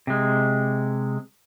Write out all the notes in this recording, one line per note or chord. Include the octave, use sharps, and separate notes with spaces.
C3 G#3